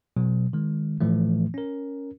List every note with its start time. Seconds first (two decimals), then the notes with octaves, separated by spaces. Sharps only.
0.17 B2 F#3
0.53 D#3 G#3
1.01 A2 E3 F3 A3
1.54 C#4 A#4